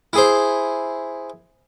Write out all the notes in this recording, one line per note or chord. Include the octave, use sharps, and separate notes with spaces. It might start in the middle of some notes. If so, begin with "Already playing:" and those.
E4 G#4 C5